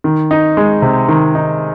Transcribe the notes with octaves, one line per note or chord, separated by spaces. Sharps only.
D#3
D#4
G#3
C3
D#3
D#4